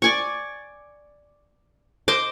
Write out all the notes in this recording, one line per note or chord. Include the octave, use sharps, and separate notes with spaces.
D5 G#5 C#6
C5 D#5 C6 D6